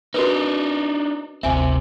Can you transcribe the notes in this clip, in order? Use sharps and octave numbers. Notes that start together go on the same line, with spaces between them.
D4 D#4 F#4 A#4 B4
G1 D2 C3 C4 E5 G#5